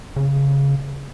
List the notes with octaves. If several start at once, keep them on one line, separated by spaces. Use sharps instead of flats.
C#3